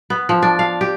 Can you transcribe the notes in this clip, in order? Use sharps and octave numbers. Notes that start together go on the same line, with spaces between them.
B3
F3
D4
F5
G4